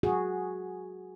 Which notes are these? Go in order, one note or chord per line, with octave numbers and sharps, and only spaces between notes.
F#4 G#4